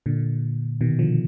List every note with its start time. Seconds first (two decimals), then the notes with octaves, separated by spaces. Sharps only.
0.06 A#2 D3
0.81 B2 D#3
0.99 D3 F3